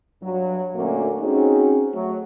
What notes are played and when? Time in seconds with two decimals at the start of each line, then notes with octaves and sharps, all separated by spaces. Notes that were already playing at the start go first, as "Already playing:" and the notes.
0.23 G2 F#3
0.75 A#2 D3 A3 A#3 C#4 F#4
1.21 C4 C#4 D#4 F#4 G#4
1.94 F#3 A3